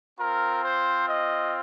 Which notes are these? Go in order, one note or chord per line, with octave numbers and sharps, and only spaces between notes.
C4 F4 A#4
C5
D#5